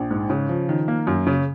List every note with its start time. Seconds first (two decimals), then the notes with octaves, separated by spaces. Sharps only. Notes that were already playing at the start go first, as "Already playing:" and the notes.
Already playing: A#1
0.11 G#2
0.30 C#3
0.49 F3
0.69 D#3
0.88 A#3
1.07 F#2
1.27 C#3